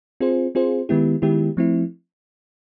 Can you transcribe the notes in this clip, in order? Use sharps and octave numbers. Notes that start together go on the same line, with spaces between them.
C4 F4 G#4 C5
C4 F4 G#4 C5
D#3 G#3 B3 E4 G4
D#3 G#3 B3 E4 G4
F3 A3 C4 E4